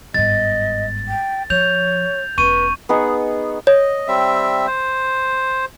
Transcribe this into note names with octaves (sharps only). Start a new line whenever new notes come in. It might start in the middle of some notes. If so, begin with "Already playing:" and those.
G1 G#2 D#5 A6
G5
F3 C#5 G6 F7
E1 C#4 B4 C#6 D#7
B3 D#4 G#4 C#6
C#5 D#5
G3 C4 E5
C5